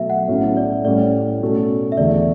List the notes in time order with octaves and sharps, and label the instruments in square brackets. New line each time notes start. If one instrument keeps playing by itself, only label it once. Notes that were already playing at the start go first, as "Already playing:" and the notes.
Already playing: [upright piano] B2 F#3 A3 [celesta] E5
[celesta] F#5
[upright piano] B1 A2 F#3 C#4 E4
[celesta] D5
[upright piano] A2 G3 C#4 [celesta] D5
[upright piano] B2 A3 C#4
[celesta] E5
[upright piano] E2 D3 A3 [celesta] D5